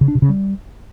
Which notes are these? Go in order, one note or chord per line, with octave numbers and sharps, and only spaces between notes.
C#3
D4
C3
C#3
G3